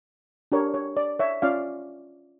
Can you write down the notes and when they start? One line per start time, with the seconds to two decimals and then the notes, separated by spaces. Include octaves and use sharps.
0.52 D4 G4 A#4 C#5
0.74 C#5
0.97 D5
1.19 C#5 E5
1.42 C#4 F4 C#5 D5 F5